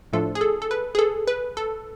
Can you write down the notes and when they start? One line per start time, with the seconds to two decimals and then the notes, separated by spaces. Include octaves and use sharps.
0.13 A2 F3 A3 D4 F4 A4
0.35 G#4
0.41 A4
0.62 A4
0.71 B4
0.95 G#4
0.99 A4
1.28 B4
1.57 A4